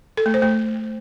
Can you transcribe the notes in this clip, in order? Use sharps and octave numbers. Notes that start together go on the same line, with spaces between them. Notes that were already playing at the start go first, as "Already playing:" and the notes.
A4
A3
C5
A3